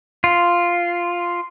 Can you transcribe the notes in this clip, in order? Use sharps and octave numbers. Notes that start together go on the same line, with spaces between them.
F4